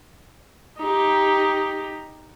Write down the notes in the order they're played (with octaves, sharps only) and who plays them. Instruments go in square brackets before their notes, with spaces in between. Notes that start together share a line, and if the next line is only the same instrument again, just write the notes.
[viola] D#4 G4